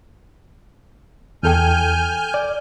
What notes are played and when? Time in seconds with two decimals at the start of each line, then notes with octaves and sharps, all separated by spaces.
1.43 E2 A4 G5 G#5 F6 G6
2.34 D5